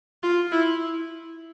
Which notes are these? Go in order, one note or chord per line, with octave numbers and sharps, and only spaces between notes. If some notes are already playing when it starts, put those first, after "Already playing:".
F4
E4